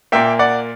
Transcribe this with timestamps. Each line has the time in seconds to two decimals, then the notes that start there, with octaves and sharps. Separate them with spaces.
0.12 A#2 A#3 E5 G5
0.39 D5 F#5